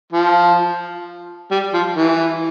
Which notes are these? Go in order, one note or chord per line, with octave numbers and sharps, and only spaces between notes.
F3
G3
F3
E3